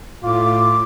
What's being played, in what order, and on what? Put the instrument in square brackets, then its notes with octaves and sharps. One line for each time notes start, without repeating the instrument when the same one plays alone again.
[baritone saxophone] A2 [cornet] F4 [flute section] D6